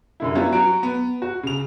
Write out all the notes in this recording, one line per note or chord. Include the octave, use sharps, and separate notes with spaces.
F#2 D3 E4
F#3 G3 B3 C#4 E4 F4
F#3 F#4 D7
B3
F#4
C#3 F7